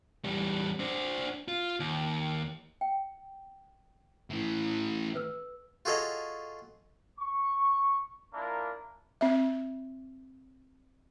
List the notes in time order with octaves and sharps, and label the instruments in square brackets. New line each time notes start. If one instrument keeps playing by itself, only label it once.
[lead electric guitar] E2 G3
D4 C5
F4
D#2
[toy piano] G5
[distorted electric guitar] A2 E3
[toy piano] A4 B4 E6
[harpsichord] F4 F#4 G#4 A4 C#5 D#5
[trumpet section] C#6
A#3 D4 E4 F4 A#4
[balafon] C4 E5